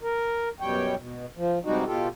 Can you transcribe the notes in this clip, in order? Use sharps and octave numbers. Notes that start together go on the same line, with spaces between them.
A#4
F#2 B2 G3 C#5 G5
B2
F3
G2 C3 G3 G#3 D#4 F#4
B2 F4 G4 A4